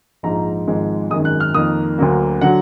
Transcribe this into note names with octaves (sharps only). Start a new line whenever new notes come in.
A#1 G#2 F3 G#3 A#5
G#1 G#2 F3 G#3
G#1 F#2 D#3 G#3 D#6
F#6
F6
F2 D#3 A#3 D#6
D2 D3 F#3 A#3
D3 F#3 F#5